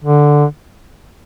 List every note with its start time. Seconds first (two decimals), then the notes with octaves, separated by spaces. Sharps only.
0.04 D3